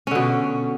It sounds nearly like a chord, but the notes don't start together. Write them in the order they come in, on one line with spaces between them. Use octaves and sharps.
C#4 D3 B2